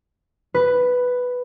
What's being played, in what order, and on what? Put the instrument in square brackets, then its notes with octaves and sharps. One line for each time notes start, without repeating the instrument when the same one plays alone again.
[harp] B4